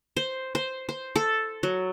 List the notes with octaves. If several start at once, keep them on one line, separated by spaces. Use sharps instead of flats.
C5
C5
C5
A4
F#3